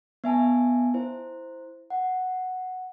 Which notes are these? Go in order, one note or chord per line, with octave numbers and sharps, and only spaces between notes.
B3 E5 G#5 A5
E4 C5
F#5